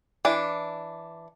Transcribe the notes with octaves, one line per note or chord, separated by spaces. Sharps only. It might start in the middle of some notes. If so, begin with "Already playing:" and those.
E3 D4